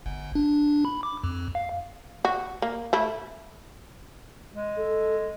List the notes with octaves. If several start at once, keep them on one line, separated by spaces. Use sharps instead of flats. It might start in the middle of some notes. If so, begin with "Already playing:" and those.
G1
D4
B5
D6
F2
F5
F#4
A#3
A3 E4
G#3
A4